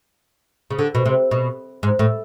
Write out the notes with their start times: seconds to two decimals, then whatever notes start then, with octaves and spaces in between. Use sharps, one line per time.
0.71 C#3
0.79 D3
0.95 B2
1.05 C3
1.31 B2
1.83 G#2
1.99 A2